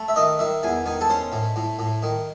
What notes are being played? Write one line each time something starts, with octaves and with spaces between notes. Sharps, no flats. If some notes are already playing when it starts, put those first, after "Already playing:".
Already playing: A3
E5
D#3 D#5
D#3 E5
E2 G#5
D#3 G#5
A4
C#4 C5
A2
A2
A2
D#3